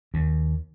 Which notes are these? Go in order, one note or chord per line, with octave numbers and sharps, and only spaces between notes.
D#2